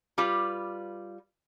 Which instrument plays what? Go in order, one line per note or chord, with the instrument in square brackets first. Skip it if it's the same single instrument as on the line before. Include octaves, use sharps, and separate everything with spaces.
[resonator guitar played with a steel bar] G3 F4 B4